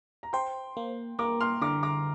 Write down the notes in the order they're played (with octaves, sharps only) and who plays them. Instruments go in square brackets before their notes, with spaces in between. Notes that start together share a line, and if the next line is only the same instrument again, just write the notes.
[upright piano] A#5
[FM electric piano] C5 [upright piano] G5 C6
[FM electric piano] A#3
[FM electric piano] A#3 [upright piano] A#5 D6
[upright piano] C6 F6
[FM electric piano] D3 [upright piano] A#5 D6
[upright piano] A#5 D6